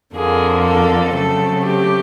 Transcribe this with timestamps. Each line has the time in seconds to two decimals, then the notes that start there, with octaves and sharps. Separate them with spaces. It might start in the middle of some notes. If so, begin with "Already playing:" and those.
0.15 F2 D3 F3 A#3 G#4
0.65 A4
1.15 C#3 F#3 A3 C4 A4
1.65 G4